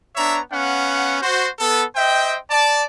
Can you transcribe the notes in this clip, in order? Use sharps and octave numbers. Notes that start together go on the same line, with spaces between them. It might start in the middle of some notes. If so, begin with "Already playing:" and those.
B3 D4 C#5 E5 A#5
B3 C#4 F5 F#5
F#4 C5
B3 A4
C5 D#5 E5 G5
D5 A5